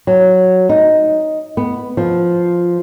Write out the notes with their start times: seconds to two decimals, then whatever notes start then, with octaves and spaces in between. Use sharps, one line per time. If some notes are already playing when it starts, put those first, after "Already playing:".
0.07 F#3
0.69 D#4
1.57 B3
1.97 F3